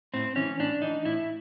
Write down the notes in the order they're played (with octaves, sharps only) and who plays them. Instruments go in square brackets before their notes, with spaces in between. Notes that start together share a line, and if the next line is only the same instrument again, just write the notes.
[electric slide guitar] A2 C4
E3 C#4
A2 D4
E3 D#4
A2 E4